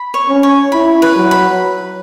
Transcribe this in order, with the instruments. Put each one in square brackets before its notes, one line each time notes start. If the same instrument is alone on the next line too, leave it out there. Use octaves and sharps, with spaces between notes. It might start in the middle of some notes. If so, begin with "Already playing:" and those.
Already playing: [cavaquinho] B5
C#5
[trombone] C#4
[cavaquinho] C#5
[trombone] E4 [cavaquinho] B5
[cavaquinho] B4
[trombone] F#3
[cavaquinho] B5